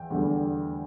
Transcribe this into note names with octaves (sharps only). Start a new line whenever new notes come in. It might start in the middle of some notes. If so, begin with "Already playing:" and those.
Already playing: E2 G5
E2 D3 G3